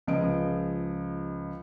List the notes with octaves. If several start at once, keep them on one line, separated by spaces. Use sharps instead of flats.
C#2 F3 G#4 D#5 D7